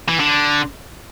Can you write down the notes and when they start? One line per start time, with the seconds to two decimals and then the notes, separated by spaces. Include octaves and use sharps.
0.08 E3
0.20 D3